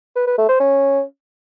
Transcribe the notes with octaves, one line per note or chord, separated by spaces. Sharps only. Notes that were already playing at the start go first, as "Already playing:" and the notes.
B4
B4
A3
C5
C#4